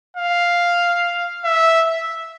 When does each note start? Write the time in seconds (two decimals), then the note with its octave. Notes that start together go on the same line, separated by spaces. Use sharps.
0.17 F5
1.45 E5